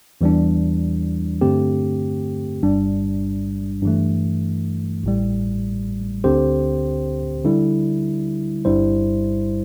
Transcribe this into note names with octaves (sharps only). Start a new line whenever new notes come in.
E2 E3 G3 D4
G2 D3 A3 C4 G4
G1 G2 G3 D4
G2 E3 A3
A1 A2 G3
D2 D3 C4 G4 C5
D3 G3 E4
G1 G2 G3 E4 C5